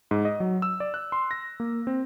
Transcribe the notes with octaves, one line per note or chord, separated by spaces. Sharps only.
G#2
D#5
F#3
E6
D5
F#6
C6
A#6
A#3
C4